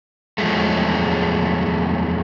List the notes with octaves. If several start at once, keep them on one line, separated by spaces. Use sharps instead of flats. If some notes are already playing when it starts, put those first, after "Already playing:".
E2 F3 F#3 G#3 A3